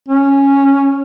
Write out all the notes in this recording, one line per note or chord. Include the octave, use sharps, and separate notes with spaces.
C#4